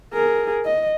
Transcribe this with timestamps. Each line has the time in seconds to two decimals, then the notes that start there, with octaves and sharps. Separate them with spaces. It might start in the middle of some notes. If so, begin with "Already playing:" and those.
0.13 G#4 A#4
0.65 D#5